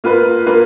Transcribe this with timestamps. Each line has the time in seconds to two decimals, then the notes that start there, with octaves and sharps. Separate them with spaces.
0.04 A#3 F4 B4
0.46 A#3 F4 B4